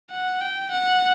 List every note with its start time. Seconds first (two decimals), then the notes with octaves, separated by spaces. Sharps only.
0.10 F#5
0.41 G5
0.71 F#5